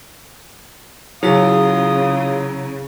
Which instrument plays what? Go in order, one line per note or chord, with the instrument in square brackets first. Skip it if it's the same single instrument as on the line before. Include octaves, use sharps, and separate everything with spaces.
[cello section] C#3 [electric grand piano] F#3 [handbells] E4 G#4 B6 [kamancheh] F4 D#6